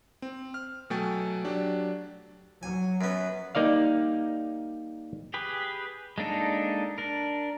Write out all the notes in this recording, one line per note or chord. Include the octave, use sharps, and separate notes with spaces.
C4
F6
B2 F#3 A3 G5 G#5 A6
F#3 D4 G4
F#3 G#5
F#2 B3
G3 A#3 D#4 D5 F5
G4 G#4 B4
G#3 A#3 D4 D#4 A4
D4 A#4